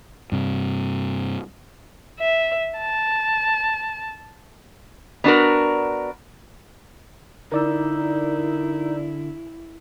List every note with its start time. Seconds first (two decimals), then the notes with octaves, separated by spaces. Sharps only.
0.32 G2 C3
2.20 E5
2.78 A5
5.24 B3 D4 F#4 A#4
7.52 D3 D#4 E4 A#4 D5 E6